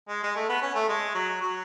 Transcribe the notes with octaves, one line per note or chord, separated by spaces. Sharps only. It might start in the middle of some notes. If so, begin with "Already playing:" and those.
G#3
G#3
A3
B3
C#4
A3
G#3
F#3
F#3